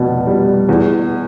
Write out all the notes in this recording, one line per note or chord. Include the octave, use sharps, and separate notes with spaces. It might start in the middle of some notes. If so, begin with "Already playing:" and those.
Already playing: F1 B2
G3
E2